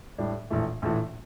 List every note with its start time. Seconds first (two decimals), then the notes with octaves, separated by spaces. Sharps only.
0.18 A2 G3 D4
0.50 A#1 A2 E3 A3
0.82 A#1 A2 E3 A3